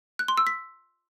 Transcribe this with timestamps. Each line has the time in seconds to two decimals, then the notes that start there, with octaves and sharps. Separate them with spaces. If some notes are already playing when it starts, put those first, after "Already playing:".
0.19 F#6
0.28 C6
0.37 E6
0.47 B6